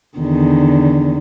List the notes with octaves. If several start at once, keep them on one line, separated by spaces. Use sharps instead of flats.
E2 D3 D#3